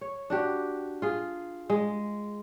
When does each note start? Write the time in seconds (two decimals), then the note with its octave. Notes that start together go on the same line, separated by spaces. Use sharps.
0.01 C#5
0.30 D4 F#4 G4
1.02 F4 G#4
1.70 G#3